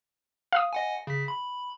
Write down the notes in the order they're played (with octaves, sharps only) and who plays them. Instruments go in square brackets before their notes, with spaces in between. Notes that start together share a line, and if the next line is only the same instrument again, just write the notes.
[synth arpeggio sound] F5 D#6
[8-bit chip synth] D#5 F#5 G#5
C#3 B6
B5